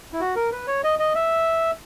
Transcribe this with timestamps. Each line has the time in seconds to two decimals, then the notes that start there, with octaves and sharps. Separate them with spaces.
0.13 E4
0.20 F#4
0.36 A#4
0.52 B4
0.67 C#5
0.84 D#5
0.99 D#5
1.15 E5